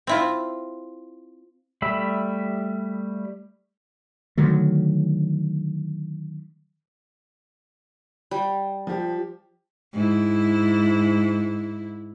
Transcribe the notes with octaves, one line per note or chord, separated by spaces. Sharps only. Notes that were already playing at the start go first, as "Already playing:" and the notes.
C4 E4 F4
G3 A3 E5 B5
D3 D#3 F#3 A3
G3
F3 G4
G#2 E4